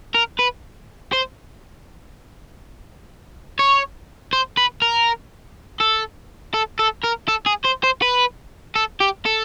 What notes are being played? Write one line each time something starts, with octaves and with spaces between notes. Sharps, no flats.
A#4
B4
C5
C#5
C5
B4
A#4
A4
A4
A4
A#4
A4
G#4
C5
C5
B4
A4
G4
A4